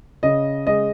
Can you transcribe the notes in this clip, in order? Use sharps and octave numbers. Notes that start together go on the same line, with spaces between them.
C#3 D#5
G#3 D#5